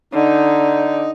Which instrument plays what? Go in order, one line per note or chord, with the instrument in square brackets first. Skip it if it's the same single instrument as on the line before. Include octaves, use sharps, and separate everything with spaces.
[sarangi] D3 [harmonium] D#4